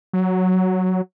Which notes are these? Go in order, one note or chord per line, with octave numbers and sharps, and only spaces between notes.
F#3